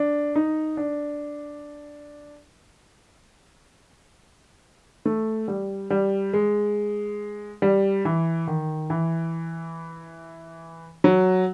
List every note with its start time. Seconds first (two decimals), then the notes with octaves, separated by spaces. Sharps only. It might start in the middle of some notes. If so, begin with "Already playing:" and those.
Already playing: D4
0.35 D#4
0.77 D4
5.06 A3
5.48 G3
5.90 G3
6.33 G#3
7.62 G3
8.05 E3
8.47 D#3
8.90 E3
11.04 F#3